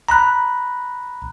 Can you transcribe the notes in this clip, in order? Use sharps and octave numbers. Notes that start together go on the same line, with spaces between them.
A#5 B5 F#6